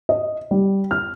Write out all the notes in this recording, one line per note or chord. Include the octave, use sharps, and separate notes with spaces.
D#5
G3
F6